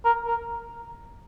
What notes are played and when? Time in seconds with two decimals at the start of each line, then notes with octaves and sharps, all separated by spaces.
0.05 A#4
0.27 A#4